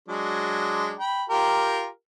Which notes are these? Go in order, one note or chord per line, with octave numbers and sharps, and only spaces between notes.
F#3 G#3 D4
G5 B5
F4 G4 A#4